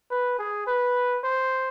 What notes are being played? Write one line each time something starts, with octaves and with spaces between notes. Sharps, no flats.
B4
G#4
B4
C5